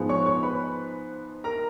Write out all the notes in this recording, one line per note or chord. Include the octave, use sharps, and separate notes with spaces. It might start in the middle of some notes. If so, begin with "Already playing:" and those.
Already playing: G#2 F3 G#3 B3
C#5 C#6
C#5 C#6
B4 B5
A#4 A#5